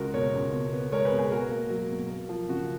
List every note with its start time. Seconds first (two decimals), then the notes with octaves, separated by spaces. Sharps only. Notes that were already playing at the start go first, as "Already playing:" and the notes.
Already playing: C#2 G#3 F#4 A#4
0.14 B2 A#4 C#5
0.34 C#2
0.53 B2
0.73 B3
0.92 G#3 A#4 C#5
1.05 G#4 B4
1.12 B2
1.18 G#4 B4
1.31 B2 F#4 A#4
1.51 A#3
1.70 F#3
1.90 B2
2.10 A#3
2.29 F3
2.49 C#3 F#4